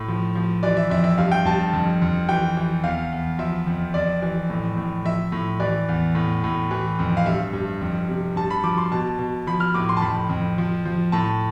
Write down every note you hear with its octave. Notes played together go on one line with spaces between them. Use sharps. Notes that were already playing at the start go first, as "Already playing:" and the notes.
Already playing: A2
F3
F3
E3 D5
E5
F2 E5
E5
G2 F5
G5
G2 A5
F2
F2
E3 G5
E3
E2 F5
E2
F3 E5
F2
F2 D5
E3
A2
A2
F3 E5
A2
E3 D5
E2
A2
A2
E3
F2
F5
G2 E5
G2
F2
C3
G2 A5
B5
F3 D6
C6
B2 A5
B2
F3 B5
F6
A2 D6
C6
A5
F2 B5
F2
F3
F3
A2 A5